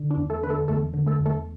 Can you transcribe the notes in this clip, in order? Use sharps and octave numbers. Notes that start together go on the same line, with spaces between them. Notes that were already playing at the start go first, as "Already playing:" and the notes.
Already playing: D3
D4
E2
A3 A4
D3 B4
A3 A4
E2 A3 A4
D3
A3 A4
E2
A3 A4